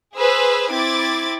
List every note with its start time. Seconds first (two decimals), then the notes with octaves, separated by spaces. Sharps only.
0.15 G#4 B4 C5 E6
0.71 C4 E4 D6 G#6 A6